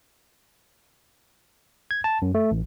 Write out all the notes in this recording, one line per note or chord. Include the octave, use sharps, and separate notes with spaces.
G#6
A5
F#2
A3
A1